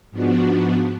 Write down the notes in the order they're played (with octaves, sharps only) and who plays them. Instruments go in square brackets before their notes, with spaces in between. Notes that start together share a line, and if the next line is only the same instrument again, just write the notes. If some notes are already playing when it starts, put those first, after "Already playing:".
[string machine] G#2 F3 B3 D4 F#4